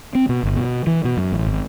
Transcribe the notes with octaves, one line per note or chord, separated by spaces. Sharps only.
C4
B2
G1
B2
E3
B2
F#2
A1
G#1